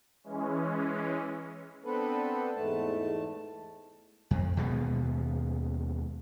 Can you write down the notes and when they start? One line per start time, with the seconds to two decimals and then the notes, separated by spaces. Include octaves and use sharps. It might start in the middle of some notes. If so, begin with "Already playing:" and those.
0.24 E3 G#3 C#4
1.85 B3 C4 D4 A4 B4
2.55 E2 G#2 A3 A5
4.31 F2
4.57 D#2 B2 G#3 B3